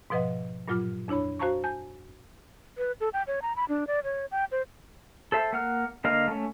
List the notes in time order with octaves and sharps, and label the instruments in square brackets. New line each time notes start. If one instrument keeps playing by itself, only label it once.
[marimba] G#2 B2 F3 B4 D#5 F#5
G2 A#2 F#3 F4 D6 F6
F2 D4 E4 C#5 B5
F#4 C5 F5 A5 A#5 C#6
G#5 A5 G6
[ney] B4
A4
G5
C#5
A#5
B5
D4
D5
C#5
G5
C5
[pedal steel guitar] A4 C5 E5
A#3 F#5 F6
D3 A#3 D#5 F5 F6
A3 C#4